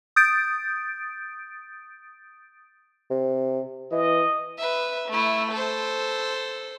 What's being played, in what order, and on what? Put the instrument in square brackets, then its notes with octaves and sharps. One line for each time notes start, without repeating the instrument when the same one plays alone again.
[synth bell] D#6 G6 A6 D7
[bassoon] C3
[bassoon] E3 [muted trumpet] D#5
[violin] B4 E5
A3 E4
A4 C5